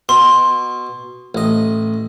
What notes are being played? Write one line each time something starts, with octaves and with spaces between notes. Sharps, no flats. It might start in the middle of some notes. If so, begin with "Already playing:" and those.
B2 C6
A1 D#5